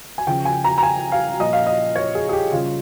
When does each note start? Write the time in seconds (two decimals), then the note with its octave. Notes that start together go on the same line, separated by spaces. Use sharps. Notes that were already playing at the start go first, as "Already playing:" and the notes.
0.18 G#5
0.27 C#3 F3 G5
0.45 G#5
0.64 A#5
0.78 A#5
0.83 G#5
1.12 F5
1.39 A#2 F3 D#5
1.53 F5
1.66 D#5
1.96 C#5
2.15 G#4
2.29 G#4
2.33 G4
2.52 C#3 G3 F4